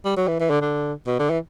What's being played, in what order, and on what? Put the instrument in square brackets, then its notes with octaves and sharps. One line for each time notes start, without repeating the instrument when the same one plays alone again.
[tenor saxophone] G3
F#3
E3
E3
D3
D3
B2
D3
E3